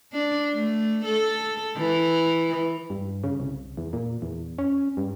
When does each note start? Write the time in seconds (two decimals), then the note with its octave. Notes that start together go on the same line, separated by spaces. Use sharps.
0.12 D4
0.54 A3
1.05 A4
1.77 E3
2.90 G2
3.24 C#3
3.40 C2
3.77 E2
3.93 A#2
4.22 E2
4.58 C#4
4.97 G2